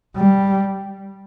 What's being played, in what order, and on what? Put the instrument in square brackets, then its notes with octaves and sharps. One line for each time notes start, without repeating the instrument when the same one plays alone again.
[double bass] G3